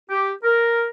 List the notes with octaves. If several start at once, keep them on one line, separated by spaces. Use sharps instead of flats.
G4
A#4